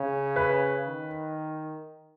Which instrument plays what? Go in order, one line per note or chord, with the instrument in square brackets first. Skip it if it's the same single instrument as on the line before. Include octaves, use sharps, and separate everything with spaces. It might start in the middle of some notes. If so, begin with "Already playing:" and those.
Already playing: [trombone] C#3
[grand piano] B4
[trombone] D#3